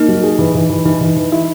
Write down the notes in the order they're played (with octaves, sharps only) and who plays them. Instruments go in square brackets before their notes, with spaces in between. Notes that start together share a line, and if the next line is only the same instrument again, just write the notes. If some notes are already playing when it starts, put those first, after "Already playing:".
Already playing: [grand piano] A#3 [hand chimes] D#4
[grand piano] F#3
G#4
E3
E3
E3
[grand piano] E3 [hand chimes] D#4
[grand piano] E3
E3
E4